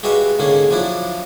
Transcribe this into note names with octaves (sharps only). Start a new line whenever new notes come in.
G#3 F#4 G4 B4 E5 F5
G#2 D3 D#3 A#3 C#4 G#4
F3 F#3 D4 E4